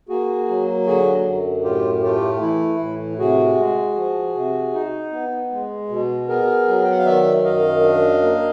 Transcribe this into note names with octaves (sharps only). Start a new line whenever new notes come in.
A#3 F#4 G#4
F#3
D3 F#4 G#4
F#2
A2 F4 G4
A3 F4 G4
E3 E4
A2
C3 F#4 G#4
G#3
F3
C3
D#4
B3
G#3
B2
B3 G#4 A#4
F#3
G5
F#5
F5
D#3 D5 E5
F#2 D#5 F5
D4
A#3